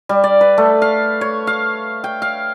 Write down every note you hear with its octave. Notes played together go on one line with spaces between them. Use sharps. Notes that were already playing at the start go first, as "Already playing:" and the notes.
G3
D5
B4
A3
F5
C#5
F5
G5
F5